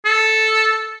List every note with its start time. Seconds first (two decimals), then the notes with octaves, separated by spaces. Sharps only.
0.05 A4